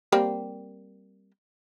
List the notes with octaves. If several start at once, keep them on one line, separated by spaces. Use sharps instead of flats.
G3 A#3 C4